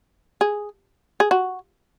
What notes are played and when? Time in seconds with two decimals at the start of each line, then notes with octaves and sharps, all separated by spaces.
0.41 G#4
1.20 G#4
1.31 F#4